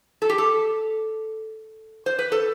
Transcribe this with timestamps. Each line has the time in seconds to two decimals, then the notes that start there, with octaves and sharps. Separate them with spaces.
0.22 A4
0.29 G4
0.38 A4
2.06 C5
2.19 B4
2.32 A4